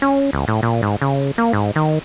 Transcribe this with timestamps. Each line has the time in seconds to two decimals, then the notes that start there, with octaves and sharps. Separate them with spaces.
0.02 C#4
0.33 C#2
0.48 A2
0.63 A#2
0.82 G#2
1.02 C#3
1.38 A#3
1.53 G#2
1.76 D#3